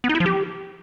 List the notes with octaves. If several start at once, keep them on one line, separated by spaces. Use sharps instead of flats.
B3
D#4
E4
F3
G4